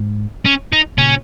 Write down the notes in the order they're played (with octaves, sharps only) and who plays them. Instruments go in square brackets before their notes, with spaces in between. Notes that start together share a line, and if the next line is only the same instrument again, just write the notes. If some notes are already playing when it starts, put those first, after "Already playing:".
Already playing: [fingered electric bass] G#2
[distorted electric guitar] C#4
D#4
[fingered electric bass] A#2 C#3 [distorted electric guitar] C#4